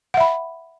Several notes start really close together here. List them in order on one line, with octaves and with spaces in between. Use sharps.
F#5 E5 B5